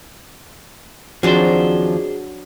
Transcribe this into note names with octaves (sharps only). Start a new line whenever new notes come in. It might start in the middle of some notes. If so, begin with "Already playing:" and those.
D#2 F3 F#3 C4 D4 G#4 C5